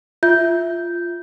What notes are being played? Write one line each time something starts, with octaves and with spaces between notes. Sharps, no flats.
F4 E5 G6